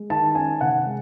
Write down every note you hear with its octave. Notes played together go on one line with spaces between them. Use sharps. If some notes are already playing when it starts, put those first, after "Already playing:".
Already playing: G#3
D#3 A5
C#4 G#5
C3 F#5
G#3